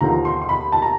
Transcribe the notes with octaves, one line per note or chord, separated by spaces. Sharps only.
D#2 D3 F3 A3 A#5
C6
C6
B5
A5
A#5